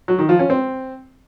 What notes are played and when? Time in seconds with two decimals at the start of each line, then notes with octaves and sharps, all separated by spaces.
0.08 F#3
0.19 D#3
0.29 F3
0.39 C#4
0.50 C4